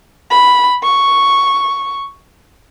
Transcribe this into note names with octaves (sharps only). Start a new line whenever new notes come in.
B5
C#6